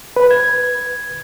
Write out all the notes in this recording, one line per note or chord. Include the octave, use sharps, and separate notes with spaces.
B4
G#6